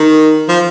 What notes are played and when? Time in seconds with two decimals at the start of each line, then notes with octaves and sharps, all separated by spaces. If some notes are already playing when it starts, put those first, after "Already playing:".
Already playing: D#3
0.49 F3